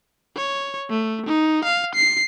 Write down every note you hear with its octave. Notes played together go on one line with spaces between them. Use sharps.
C#5
A3
D#4
F5
C7